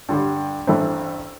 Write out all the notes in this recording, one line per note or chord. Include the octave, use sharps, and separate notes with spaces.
G2 D3 G3
A1 G2 E3 A3 C4